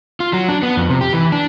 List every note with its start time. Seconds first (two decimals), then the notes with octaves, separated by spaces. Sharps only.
0.20 F4
0.33 F#3
0.49 D4
0.63 B3
0.77 F2
0.89 C3
1.01 G4
1.13 E3
1.32 D4